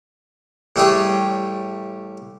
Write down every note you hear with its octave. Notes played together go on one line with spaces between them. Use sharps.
A1 G3 A3 G4 G#4 C#5